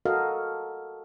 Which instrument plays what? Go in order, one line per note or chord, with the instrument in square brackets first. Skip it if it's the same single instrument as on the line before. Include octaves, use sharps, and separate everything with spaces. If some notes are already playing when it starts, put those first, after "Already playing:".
[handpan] F#4 A4 A#4 D#5 F5